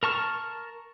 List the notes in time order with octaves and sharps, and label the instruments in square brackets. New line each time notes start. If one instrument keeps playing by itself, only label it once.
[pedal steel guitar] A#4 A5 C#6 F6